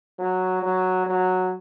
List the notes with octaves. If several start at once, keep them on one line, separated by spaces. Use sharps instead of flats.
F#3
F#3
F#3